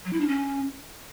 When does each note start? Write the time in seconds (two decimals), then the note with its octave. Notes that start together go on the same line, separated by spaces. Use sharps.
0.05 F#3
0.13 E4
0.20 D4
0.28 C#4